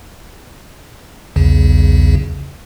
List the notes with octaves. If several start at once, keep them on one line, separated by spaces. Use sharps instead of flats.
B1 E2 C#3